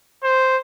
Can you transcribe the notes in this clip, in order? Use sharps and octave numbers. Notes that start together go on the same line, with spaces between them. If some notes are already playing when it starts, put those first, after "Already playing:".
C5